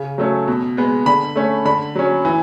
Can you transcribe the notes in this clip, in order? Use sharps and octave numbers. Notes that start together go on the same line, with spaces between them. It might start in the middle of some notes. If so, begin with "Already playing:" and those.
Already playing: C#3
F#3 A3 C#4
B2
G#3 B3
D3 B5
A3 C#4
D3 B5
F#3 C#4
E3